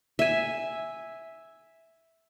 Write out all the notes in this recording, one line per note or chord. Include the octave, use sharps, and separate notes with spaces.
E5 G#5